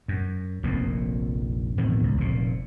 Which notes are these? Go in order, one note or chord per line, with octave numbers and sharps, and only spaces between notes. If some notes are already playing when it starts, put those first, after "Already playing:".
F#2
F1 A#1 F2 A#2
A1 F2 B2 D#3
C#2
F1 A#2